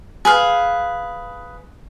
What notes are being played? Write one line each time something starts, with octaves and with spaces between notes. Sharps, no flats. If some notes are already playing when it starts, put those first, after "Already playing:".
G#4 B4 F5